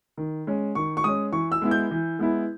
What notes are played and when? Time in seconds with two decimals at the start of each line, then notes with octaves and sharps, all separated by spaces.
0.18 D#3
0.47 G#3 C#4
0.75 D#3 C#6
0.97 C#6
1.04 G#3 C#4 D#6
1.32 E3 C#6
1.52 E6
1.62 G#3 B3 E4
1.71 G6
1.91 E3
2.19 G#3 B3 E4